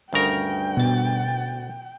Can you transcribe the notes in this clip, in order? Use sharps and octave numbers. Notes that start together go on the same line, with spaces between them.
D2 G2 C#3 A#4 G5
B2 A6